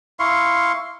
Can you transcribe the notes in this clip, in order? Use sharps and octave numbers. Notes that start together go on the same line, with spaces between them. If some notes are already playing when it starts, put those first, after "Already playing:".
E4 F5 C6 C#6